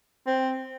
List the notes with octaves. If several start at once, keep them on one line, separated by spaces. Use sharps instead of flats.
C4